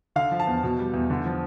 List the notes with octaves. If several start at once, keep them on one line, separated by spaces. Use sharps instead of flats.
D3 F5
F3
A5
E2
B2
G3
E2
D3
F3